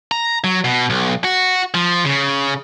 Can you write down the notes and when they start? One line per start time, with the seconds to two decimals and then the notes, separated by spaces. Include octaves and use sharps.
0.12 A#5
0.44 F#3
0.65 B2
0.90 B1
1.24 F#4
1.74 F3
2.05 C#3